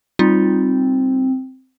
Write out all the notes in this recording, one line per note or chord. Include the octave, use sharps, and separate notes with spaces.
G3 C4 D#4 F4